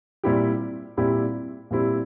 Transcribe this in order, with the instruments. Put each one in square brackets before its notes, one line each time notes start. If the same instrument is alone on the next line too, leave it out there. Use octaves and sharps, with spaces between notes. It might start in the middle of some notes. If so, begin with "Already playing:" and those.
[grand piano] A#2 G3 C4 E4 G4
A#2 G3 C4 E4 G4
A#2 G3 C4 E4 G4